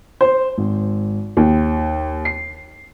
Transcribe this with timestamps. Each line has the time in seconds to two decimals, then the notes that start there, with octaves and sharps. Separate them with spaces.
0.21 C5
0.58 G#1
1.37 D#2
2.25 C7